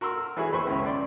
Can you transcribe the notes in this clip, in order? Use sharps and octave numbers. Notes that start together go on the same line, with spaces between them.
F#4 A#4 C6 E6
E3 E4 F#4 G#4 C#5
D#2 B4 C5 E5 C#6
C#2 C#4
F#2 D5 C6